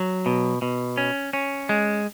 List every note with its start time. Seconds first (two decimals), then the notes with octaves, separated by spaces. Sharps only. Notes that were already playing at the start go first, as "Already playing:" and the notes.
Already playing: F#3
0.26 B2
0.62 B2
0.97 C#4
1.33 C#4
1.69 G#3